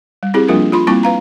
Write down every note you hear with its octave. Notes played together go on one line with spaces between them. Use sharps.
G3
C4 E4 G4 G#4
F3 G3 A#3 D4 F4 A#4
F4 B5 C6
G3 A#3 C4 E4 A5 C#6
B4 F5 A#5